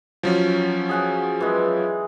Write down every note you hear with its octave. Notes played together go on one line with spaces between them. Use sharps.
F3 F#3 C#4
G#4 F#5 G#5
E3 G#3